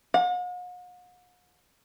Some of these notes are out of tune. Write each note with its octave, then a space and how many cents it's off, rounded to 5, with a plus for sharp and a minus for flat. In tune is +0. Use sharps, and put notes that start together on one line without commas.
F#5 -45